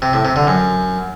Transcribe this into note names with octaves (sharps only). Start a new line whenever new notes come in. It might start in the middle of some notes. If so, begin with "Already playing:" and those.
C3
A2
C3
D3
F#2